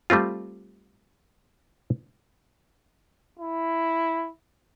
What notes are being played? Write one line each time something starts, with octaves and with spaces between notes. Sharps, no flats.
G3 A3 C4 F4
E4